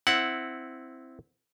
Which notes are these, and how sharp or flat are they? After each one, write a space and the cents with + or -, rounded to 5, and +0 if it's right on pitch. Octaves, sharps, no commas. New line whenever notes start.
C4 +0 E4 +0 F#5 +0